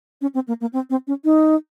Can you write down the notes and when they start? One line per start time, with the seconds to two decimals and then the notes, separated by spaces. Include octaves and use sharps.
0.21 C#4
0.34 C4
0.48 A#3
0.61 A#3
0.73 C4
0.90 C4
1.07 C#4
1.24 D#4